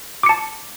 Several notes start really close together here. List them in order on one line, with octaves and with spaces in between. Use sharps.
D6 C#7 A5